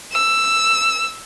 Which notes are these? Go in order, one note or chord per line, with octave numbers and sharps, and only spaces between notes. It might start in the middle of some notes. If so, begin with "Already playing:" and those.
E6